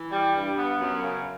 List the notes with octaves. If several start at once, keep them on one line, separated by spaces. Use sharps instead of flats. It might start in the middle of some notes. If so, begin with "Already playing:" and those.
Already playing: E3
G3
G2
B3
F#2
C#3